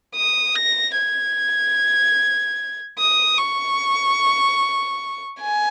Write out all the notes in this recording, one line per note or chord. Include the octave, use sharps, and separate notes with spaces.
D#6
A#6
G#6
D#6
C#6
G#5